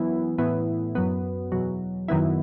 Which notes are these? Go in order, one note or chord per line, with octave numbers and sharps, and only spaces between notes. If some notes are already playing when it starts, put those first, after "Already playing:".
Already playing: F#2 E3 B3 E4
A2 E3 B3 E4
F#2 F#3 B3
E2 B2 F#3
F#2 D#3 F#3 B3 E4